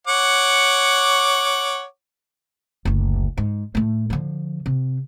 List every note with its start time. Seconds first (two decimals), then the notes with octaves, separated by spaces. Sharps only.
0.07 C#5 F#5 D6
2.85 F#1 D2
3.37 G#2
3.75 A2 A3
4.10 D3 F3
4.66 C3